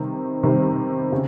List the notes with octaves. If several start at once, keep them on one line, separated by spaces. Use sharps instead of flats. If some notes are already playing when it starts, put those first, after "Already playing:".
Already playing: C3 D#3 G3 C4
C3 D#3 G3 C4
C#3